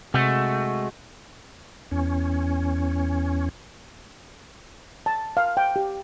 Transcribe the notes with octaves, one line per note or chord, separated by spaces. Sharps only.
C3 G#3 A3 F#4
E2 C#4
A5
F5
G5
G4